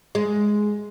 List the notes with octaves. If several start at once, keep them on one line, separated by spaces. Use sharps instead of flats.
G#3